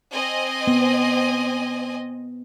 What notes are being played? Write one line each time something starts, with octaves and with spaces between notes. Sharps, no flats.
C4 D#5 G#5
B3